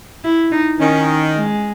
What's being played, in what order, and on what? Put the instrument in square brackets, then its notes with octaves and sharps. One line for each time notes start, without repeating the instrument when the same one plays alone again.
[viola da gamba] E4
D#4
[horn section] D#3 [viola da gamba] C#4
[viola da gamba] G#3